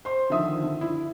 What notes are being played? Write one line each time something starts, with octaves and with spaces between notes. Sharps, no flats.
C5 C6
D3 D#3 F3 E5 D#6
D3
E4